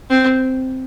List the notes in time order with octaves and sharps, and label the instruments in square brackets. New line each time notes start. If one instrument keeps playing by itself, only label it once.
[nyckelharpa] C4